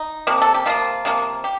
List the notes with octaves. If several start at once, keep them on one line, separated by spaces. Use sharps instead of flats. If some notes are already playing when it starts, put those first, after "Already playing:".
Already playing: D#4
C3 F3 A#3
A4
G4
C3 F3 A#3 F4
C3 F3 A#3
G4